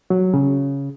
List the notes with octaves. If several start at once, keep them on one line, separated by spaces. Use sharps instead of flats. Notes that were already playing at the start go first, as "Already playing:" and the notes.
F#3
C#3